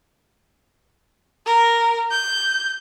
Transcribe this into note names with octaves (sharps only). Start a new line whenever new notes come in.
A#4
G6